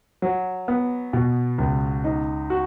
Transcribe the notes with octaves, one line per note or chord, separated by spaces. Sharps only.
F#3
B3
B2
C#2
D#4
F#4